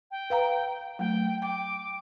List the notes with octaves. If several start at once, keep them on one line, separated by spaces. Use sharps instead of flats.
G5
B4 F5 A#5
F#3 A3 G5
G5 D6